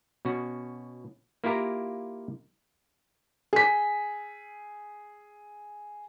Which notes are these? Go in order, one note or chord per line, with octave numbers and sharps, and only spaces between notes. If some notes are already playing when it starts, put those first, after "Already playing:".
B2 C#4 F#4
A#3 E4 F4 G4 A#4 A#5
G#4 B6